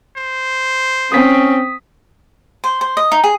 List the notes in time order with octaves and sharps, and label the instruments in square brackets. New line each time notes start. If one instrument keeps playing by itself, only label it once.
[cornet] C5
[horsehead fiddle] C4 [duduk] C#4 [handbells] D#6 B6
[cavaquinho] C5
C5
D#5
D#4
G#4